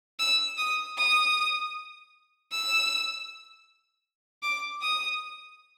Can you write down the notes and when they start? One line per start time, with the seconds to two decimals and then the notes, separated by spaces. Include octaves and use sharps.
0.19 E6
0.58 D#6
0.97 D#6
2.51 E6
4.42 D6
4.82 D#6